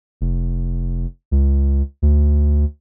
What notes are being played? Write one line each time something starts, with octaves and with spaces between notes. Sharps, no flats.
F1
C#2
D2